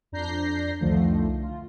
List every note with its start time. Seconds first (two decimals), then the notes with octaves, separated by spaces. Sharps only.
0.12 F2 D4 A#5 G6 A#6 C7
0.80 C2 F2 D3 D#3 F3 A3
1.43 F4